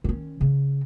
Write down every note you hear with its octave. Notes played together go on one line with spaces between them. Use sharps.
D#3 C#4
C#3